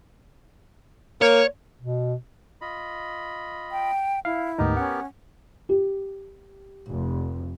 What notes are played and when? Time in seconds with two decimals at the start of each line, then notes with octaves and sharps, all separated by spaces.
1.22 A#3 C#5
1.82 B2
2.61 F4 D#5 B5
3.71 G5
4.25 E4 F5
4.59 D2 G#2 B3 D#4 G4 A#4
4.77 C#4 F#5
5.69 G4
6.89 F1